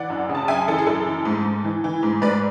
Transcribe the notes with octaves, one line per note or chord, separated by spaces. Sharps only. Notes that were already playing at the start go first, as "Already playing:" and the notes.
Already playing: E3 D5 F#5
F#2
C#3
A5
F#2 E5 G#5
E3 A4
G#4
F#2 A4
E3
G#2
G#2
E3
E3
G#2
G#2 B4 D5